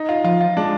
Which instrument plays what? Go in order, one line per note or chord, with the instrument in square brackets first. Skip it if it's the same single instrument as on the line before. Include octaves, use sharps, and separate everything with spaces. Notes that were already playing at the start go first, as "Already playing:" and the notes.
Already playing: [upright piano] D#4
F4
[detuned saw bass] F3 [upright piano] F4
[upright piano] F4
[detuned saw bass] G#3 [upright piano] D4